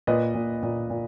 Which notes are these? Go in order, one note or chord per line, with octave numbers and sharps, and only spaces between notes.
A#2 B4 D#5
A#2
A#2
A#2